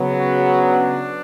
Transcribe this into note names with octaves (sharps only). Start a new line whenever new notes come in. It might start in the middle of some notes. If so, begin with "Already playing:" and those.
Already playing: C#3 F#3 B3
F#4
D4